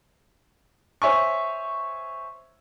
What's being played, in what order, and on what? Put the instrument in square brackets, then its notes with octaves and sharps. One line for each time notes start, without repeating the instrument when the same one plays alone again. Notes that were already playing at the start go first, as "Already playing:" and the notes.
[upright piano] C5 C#5 E5 G#5 C#6